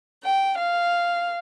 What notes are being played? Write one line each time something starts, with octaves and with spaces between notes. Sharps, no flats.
G5
F5